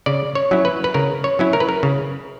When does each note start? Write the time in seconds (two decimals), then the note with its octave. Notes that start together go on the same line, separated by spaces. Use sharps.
0.06 C#3 D5
0.35 C#5
0.51 F#3 C#4 E4
0.65 B4
0.84 B4
0.94 C#3 A#4
1.24 C#5
1.39 F#3 C#4 E4
1.53 A#4
1.60 B4
1.69 A#4
1.83 C#3